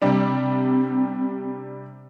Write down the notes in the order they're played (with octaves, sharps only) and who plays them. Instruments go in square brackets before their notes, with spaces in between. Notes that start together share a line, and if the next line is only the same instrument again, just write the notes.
[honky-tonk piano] C3 G3 D4 [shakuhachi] C4